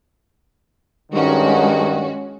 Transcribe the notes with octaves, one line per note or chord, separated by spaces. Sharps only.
G2 D#3 G#3 C#4 F#4